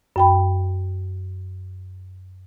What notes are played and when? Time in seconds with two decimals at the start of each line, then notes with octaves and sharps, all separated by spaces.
0.16 F#2 G5 B5